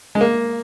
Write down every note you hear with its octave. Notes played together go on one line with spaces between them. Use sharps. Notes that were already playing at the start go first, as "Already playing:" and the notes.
G#3
A#3